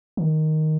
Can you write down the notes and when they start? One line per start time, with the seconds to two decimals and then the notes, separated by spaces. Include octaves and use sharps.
0.17 D#3